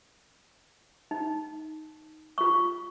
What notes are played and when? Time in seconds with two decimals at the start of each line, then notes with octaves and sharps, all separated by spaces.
1.11 D#4
2.38 F4 C#6